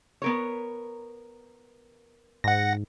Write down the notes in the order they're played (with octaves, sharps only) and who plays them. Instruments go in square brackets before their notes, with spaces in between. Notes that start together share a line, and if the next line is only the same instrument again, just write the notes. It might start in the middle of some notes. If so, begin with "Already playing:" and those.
[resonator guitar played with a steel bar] B3 A#4 C#5
[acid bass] G#2 [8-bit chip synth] F#5 A#6